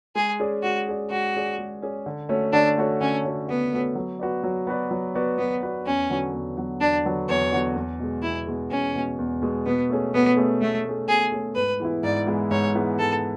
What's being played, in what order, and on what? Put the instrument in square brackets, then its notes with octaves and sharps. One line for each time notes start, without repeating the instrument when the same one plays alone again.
[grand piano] G#3 [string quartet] G#4
[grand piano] C#4 G#4 D5
[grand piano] G#3 [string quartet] F#4
[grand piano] C#4 G#4 D5
[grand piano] G#3 [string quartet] F#4
[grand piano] C#4 G#4 D5
G#3
C#4 G#4 D5
D3
A3 C#4 F#4 C#5
[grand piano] D3 [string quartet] D4
[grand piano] A3 C#4 F#4 C#5
[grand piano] D3 [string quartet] C#4
[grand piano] A3 C#4 F#4 C#5
[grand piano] D3 [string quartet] B3
[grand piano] A3 C#4 F#4 C#5
F#3
B3 F#4 B4 D5
F#3
B3 F#4 B4 D5
F#3
B3 F#4 B4 D5
[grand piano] F#3 [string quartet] B3
[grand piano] B3 F#4 B4 D5
[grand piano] E2 [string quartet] C#4
[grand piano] D3 F#3 B3 F#4
E2
D3 F#3 B3 F#4
[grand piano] E2 [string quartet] D4
[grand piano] D3 F#3 B3 F#4
[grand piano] E2 [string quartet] C#5
[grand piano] D3 F#3 B3 F#4
E2
B2 G#3
[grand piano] E2 [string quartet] E4
[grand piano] B2 G#3
[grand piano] E2 [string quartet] C#4
[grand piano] B2 G#3
E2
B2 G#3
[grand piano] B2 [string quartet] B3
[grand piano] A3 C#4 G#4
[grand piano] B2 [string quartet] B3
[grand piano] A3 C#4 G#4
[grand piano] B2 [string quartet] A3
[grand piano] A3 C#4 G#4
[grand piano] B2 [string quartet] G#4
[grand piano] A3 C#4 G#4
[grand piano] G#2 [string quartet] B4
[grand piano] E3 G#3 B3 E4
[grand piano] G#2 [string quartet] D5
[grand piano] E3 G#3 B3 E4
[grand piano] G#2 [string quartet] C#5
[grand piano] E3 G#3 B3 E4
[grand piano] G#2 [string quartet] A4